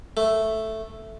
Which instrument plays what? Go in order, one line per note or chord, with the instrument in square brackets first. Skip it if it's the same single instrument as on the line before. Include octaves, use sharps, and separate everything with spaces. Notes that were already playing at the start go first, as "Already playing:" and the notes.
[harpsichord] A3